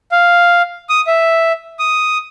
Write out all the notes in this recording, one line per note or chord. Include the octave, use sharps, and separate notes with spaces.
F5
D#6
E5
D#6